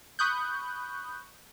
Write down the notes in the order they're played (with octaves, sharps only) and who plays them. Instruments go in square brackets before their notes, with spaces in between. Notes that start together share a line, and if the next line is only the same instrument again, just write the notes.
[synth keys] B5 C#6 D#6 F#6 G6